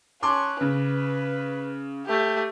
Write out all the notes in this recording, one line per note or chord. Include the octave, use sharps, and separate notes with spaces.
C#4 A5 C6 D6 F#6
C#3 B4
A3 G4